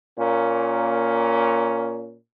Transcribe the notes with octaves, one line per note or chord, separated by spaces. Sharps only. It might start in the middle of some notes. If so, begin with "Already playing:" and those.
A#2 A#3 C#4